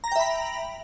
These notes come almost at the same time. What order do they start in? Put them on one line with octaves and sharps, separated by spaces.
A#5 A#6 G5 E5 B5